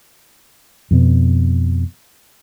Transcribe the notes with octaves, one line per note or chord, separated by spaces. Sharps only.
F2 B2